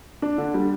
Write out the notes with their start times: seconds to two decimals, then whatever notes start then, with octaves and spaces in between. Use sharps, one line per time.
0.22 D4
0.38 D3
0.54 G3